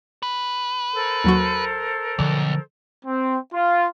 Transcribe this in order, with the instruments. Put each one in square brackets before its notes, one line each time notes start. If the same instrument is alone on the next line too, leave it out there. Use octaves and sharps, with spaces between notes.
[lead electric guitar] B4
[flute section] A4 A#4 C5
[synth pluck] D#2 F#3 F#4
[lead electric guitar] B1 [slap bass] D3 F3 [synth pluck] D5
[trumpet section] C4
F4